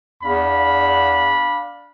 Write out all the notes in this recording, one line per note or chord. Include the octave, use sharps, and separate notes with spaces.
E2 D4 F5 B5